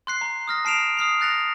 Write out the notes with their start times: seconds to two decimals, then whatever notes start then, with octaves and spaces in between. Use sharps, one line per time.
0.07 C6 F#6 C7
0.21 A#5
0.48 D#6 F6 A#6
0.65 A5 C7 D7 E7 F7
0.97 D#6 F6 C7 F7
1.21 F#6 A6 A#6 C#7 F7